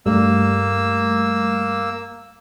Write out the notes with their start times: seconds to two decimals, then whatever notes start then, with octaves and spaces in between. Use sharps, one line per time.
0.06 G2 G3 A3 A#3 E6